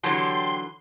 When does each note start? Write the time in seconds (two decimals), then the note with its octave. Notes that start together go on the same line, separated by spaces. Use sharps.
0.03 D3 E3 F#3 G4 A4 C#5 C6